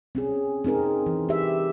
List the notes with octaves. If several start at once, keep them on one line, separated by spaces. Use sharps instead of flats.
C4 C#4 G#4
C4 D#4 G#4 A#4
E3
G4 E5